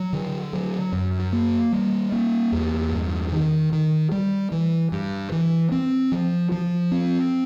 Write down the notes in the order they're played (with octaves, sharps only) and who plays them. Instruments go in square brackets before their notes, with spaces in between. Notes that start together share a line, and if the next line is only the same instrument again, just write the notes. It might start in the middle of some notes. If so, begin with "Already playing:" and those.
Already playing: [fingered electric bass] F#3
D3
F#3
F#2
A#3
G3
A#3
E2
G2
D#3
D#3
G3
E3
G2
E3
C4
F3
F3
C4